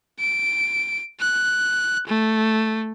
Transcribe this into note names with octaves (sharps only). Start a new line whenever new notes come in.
D7
F#6
A3